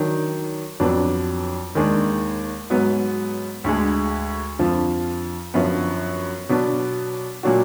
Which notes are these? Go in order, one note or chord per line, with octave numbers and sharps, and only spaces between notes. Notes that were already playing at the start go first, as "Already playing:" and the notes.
Already playing: D#3 F#3 D4
F2 D3 F#3 B3 D4
D#2 D#3 G#3 D4
G#2 F#3 B3
D2 D3 G#3
F2 D3 F3
F#2 D3 F3 B3
B2 F#3 B3 D4
A#2 F#3 D4 F#4